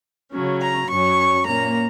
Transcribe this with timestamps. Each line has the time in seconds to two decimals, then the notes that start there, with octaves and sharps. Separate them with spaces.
0.31 C#3 F#3 C#4
0.61 A#5
0.89 F#2 F#3 C#4 C#6
1.47 A#2 A#3 C#4 A#5